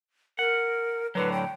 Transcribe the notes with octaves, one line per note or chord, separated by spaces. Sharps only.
A#4 F#5
A2 D3 F#3 B4
G5